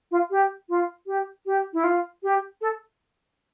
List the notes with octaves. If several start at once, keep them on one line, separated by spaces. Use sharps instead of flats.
F4
G4
F4
G4
G4
E4
F4
G4
A4